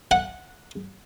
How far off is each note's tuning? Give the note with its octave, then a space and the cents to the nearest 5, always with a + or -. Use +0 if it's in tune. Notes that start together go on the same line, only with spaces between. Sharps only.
F#5 -10